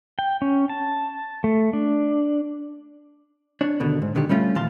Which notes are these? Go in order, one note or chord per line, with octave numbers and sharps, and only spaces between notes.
G5
C#4
A5
A3
D4
D4 C#5
D#2 B2 D3
G#2
B2 D3 D#3 G4
G3 A3 C#4 F4
D#2 A#2 E3 F5 A5 C6